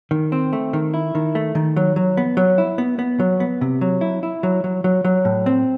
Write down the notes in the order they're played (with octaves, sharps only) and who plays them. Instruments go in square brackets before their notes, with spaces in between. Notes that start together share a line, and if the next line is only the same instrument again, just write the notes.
[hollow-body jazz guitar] D#3
C4
A3
D#3
E4
D#3
A3
D#3
F#3
F#3
B3
F#3
E4
B3
B3
F#3
B3
C3
F#3
E4
E4
F#3
F#3
F#3
F#3
A2
C4